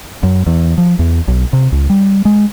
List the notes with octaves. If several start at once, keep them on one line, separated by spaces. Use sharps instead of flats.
F#2
E2
F3
E2
B1
C3
C#2
G3
G#3